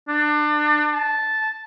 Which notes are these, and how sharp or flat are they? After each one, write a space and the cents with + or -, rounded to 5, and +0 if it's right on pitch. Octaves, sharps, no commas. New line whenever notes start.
D4 +30
A5 -10